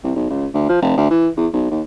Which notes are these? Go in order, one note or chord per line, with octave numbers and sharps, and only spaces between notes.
C2
B1
C#2
D2
F3
F1
D2
E3
E2
B1
D#2